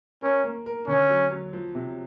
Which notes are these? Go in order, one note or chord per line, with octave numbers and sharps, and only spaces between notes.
C#4 A#4
A#3
A#4
D3 C#4
F#3
F#3
F3
C3